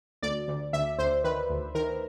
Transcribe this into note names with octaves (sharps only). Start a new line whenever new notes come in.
D2 D5
D2
D2 E5
D2 C5
D#3 B4
D2
D#3 A#4